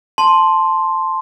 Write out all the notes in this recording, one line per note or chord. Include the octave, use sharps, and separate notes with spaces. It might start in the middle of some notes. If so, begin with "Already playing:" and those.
A5 C6